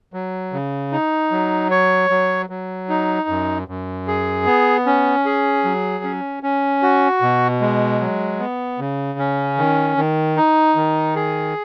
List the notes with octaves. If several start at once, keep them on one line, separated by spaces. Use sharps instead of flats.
F#3
C#3
D#4
F#3
C#5
F#3
F#3
D#4
F#2
F#2
G#4
B3
C#4
G#4
F#3
C#4
C#4
F#4
B2
G#3
F#3
B3
C#3
C#4
D#3
D#3
D#4
D#3
G#4